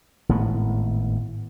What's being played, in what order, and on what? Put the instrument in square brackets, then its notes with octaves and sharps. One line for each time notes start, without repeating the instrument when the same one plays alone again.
[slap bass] G#1 A2 B3